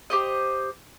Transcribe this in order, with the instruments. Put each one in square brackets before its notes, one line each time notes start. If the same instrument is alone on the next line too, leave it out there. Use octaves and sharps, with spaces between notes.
[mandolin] G4 C5 D#5